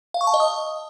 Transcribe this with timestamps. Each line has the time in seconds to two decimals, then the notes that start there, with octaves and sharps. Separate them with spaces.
0.14 F5
0.21 C#6
0.27 A5
0.34 D#5
0.40 D#6